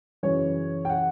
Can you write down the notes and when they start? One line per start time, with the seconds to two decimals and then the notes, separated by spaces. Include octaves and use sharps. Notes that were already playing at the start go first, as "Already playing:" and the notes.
0.23 F#2 C#3 E3 C#5
0.85 G5
0.90 F#5